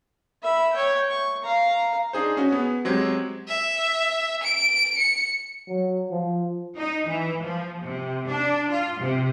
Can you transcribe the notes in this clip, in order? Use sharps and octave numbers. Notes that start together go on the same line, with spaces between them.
E5 B5
C#5 G5
C#6
F5 A#5
D4 D#4 G#4 C5
C#4 F#4
B3 G#4
F#3 G#3 C4 G4 G#6
E5
D7
C#7
F#3
F3
D#4
E3
F3
C3
D4
F4
C3